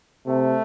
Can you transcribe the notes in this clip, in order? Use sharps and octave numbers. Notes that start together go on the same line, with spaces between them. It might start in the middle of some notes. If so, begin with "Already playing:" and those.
C3 A3